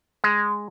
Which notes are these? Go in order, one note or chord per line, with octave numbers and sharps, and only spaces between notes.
G#3